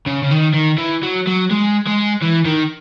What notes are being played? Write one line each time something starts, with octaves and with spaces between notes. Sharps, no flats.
C#3
C#3
D#3
D#3
E3
F#3
F#3
G#3
G#3
E3
D#3